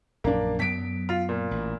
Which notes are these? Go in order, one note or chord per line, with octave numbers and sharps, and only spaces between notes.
A#1 F#2 A#3 D4
F#2 F#3 B3 B6 D7
F4
A#2
A1